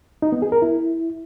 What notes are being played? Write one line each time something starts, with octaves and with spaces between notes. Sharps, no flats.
D#4
B3
G#4
A#4
E4